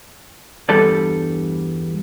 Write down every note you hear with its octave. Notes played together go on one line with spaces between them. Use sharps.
E2 G2 G3 A4 D5